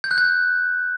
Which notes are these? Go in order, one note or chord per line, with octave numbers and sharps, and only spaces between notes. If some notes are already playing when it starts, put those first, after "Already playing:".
G6
F#6
G6